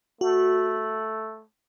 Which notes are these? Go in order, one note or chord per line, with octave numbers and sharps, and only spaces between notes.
A3 F#4